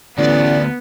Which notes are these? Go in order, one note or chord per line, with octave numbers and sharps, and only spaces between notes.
A1 D2 B3 D5